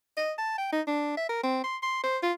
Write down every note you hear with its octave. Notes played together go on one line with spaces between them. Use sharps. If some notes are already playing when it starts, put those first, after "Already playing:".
D#5
A5
G5
D#4
D4
E5
A#4
C4
C6
C6
C5
F4